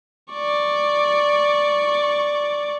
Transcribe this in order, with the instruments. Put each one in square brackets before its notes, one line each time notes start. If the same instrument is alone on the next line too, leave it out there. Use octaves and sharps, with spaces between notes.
[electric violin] D5 C#6